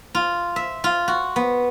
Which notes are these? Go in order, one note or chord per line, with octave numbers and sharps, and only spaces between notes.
F4
E5
F4
F#4
B3